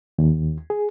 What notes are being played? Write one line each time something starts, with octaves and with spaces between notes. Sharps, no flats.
D#2
G#4